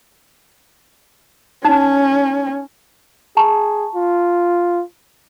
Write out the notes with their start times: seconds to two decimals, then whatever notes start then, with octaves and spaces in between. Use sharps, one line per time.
1.65 C#4 D#4 A5
3.37 G#4 A5 A#5 C#6
3.95 F4